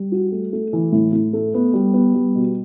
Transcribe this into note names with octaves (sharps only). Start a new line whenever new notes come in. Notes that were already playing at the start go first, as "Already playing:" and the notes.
Already playing: G3
F#4
A3
A3
E3
A2
A2
A3
B3
G3
B3
G3
B2